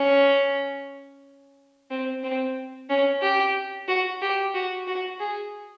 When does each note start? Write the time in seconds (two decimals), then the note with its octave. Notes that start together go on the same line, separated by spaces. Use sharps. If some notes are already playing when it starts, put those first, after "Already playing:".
Already playing: C#4
1.90 C4
2.24 C4
2.90 C#4
3.22 G4
3.88 F#4
4.22 G4
4.54 F#4
4.87 F#4
5.20 G#4